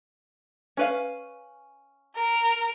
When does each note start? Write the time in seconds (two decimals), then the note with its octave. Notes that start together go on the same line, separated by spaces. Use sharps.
0.77 C#4 B4 F5
2.16 A#4